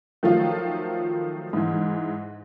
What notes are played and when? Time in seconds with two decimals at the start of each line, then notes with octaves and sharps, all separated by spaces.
0.23 D#3 F3 F#3 A3 F4
1.53 G#2 E3